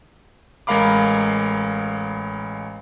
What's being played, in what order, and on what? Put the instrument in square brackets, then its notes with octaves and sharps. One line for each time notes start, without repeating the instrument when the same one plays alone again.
[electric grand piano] A1 G#3 A#4 F5 B5 D6